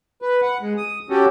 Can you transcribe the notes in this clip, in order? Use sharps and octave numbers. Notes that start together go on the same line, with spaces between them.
B4
F#5
G#3
D#6
C#4 F#4 G4 A4